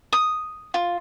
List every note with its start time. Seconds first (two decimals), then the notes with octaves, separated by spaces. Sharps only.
0.13 D#6
0.74 F4